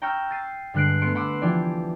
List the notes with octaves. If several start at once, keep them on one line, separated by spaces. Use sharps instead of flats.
G5 A#5 C#6 E6 F6 G6
A6 C7 D#7
G2 D3 G#3 F#6 C7 D7
A3 B3 C6 C#7 D7
F#5 B5 C6 D6 E6
E3 F3 G4 G#4 D5